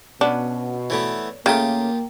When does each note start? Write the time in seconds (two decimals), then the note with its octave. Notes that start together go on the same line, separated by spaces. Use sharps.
0.21 B2 C#4 D4 B4 F#5
0.90 E3 A3 B3 C#5 D5
1.46 C#3 A3 A#3 F4 G4 G5 A#5 D#6